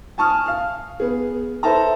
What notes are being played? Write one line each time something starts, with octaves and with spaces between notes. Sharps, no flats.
G#5 A5 C#6 D#6 F6
F5 F6
B3 G#4
A4 B4 C5 E5 A5 A#5